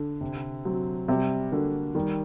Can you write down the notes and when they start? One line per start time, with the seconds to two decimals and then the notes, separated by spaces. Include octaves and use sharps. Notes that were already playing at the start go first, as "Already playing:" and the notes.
Already playing: D3
0.21 C3
0.65 F#3 C4
1.08 C3 G3
1.52 D3 A#3 F#4 A4
1.95 D#3 G3